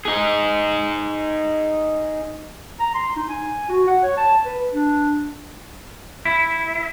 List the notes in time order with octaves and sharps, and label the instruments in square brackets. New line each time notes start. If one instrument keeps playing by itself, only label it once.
[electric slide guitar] D#4 G#4
[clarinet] A#5
C6
D#4
G#5
F#4
F#5
C#5
A5
B4
D4
[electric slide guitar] E4